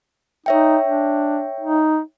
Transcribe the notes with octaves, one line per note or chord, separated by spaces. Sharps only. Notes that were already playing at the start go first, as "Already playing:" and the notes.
D#4 C#5 E5 G5
D4
D#4